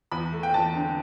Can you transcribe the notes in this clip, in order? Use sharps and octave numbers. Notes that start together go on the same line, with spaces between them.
E2 B5
A3
G5
E2 A5
D3